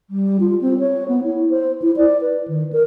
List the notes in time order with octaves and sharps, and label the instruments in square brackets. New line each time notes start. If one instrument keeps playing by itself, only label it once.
[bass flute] G3
F4
C4
C#5
B3
E4
C5
E4
D5
B4
D#3
A#4